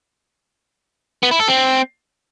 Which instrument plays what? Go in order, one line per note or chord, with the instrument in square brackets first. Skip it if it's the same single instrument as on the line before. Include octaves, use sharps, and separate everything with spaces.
[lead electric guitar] B3
E4
A4
C4